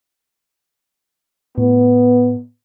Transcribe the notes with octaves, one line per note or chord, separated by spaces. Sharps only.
A2 B3